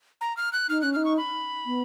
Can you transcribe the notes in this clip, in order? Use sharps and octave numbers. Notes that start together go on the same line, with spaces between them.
A#5
F6
F#6
D#4 F6
C#4 F#6
D#4 F6
C#6
B5
B3